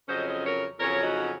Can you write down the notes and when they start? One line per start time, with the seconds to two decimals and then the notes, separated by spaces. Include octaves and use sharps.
0.09 F2 C#3 F#3 C#4 C5 D#5
0.27 C5 D#5
0.44 A#4 C#5
0.79 F2 C#3 F#3 C#4 A#4 C#5
1.02 D#4 F#4